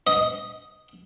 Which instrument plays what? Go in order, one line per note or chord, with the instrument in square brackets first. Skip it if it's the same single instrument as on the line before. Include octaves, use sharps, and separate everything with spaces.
[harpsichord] D#5